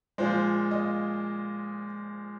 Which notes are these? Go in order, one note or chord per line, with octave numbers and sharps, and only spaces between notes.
A#2 F3 G#3 C5
D#5